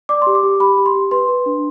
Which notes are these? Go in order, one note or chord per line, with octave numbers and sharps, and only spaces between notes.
D5 D6
G4 C6
D6
G4
G4 B5
G4
C6
G4
B4 C6
B4
D4